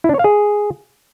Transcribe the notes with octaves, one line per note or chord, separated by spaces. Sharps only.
E4
D4
C#5
F5
G#4